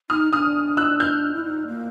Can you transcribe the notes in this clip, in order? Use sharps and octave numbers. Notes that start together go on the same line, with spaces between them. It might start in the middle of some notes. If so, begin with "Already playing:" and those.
D#4 D#6 F6
D4 D#6 F6
E6 F#6
F6 G6
E4
D#4
A#3